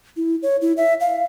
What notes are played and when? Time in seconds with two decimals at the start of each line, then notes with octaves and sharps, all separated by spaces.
0.17 E4
0.43 C#5
0.61 E4
0.77 E5
1.00 F5